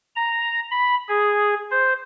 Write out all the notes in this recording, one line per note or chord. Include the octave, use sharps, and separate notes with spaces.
A#5
B5
G#4
C5